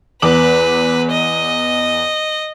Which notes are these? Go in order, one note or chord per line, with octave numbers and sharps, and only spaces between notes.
E2 B4 D6 F#7
D#5